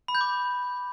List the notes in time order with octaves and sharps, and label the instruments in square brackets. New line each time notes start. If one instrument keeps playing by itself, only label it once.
[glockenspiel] B5
G6
D6